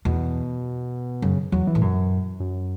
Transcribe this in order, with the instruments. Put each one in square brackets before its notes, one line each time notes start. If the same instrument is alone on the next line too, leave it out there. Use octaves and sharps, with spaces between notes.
[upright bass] E2 [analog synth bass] B2
[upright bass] F#2 [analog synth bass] C#3
[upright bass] E2 [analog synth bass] F#3
[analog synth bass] E3
[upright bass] A2
F#2
[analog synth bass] F#2